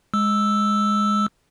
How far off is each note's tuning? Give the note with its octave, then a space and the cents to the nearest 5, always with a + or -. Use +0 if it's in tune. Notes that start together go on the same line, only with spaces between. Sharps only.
G#3 +0 E6 +0